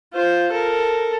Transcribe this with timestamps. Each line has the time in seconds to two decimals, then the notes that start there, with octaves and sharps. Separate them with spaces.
0.13 F4 C5
0.52 A4 A#4